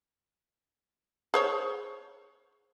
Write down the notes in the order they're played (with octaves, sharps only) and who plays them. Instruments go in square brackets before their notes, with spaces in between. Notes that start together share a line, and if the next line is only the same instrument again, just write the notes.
[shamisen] G#4 C5 C#5